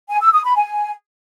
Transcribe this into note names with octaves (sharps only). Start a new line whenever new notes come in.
G#5
E6
D#6
B5
G#5